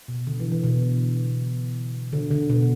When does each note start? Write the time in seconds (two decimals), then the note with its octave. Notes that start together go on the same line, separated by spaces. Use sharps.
0.08 B2
0.27 D3
0.40 E3
0.52 E3
0.64 B2
2.13 D3
2.31 D3
2.50 B2